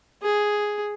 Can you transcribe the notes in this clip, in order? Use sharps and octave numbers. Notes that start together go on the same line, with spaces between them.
G#4